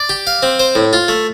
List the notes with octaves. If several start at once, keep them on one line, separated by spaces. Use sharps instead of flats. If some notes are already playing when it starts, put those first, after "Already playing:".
Already playing: D5
G4
F5
C4
C5
A2
F4
A3